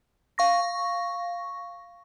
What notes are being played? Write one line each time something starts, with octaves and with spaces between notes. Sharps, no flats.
F5 C#6 A#6